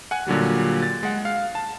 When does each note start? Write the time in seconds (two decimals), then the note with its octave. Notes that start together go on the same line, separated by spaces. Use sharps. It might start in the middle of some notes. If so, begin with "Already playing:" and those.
0.11 F#5 G#5 F#6
0.27 A#2 D3 F#3 G3
0.82 A6
1.03 G#3 F#5
1.25 F5
1.55 A5